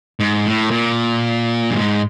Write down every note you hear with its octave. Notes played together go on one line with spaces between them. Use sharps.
G#2
A2
A#2
G2
G#2